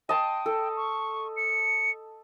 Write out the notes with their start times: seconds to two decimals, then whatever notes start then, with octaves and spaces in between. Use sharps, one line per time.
0.09 D#5 G5 A5 C6
0.46 A4
0.76 C#6
1.36 C#7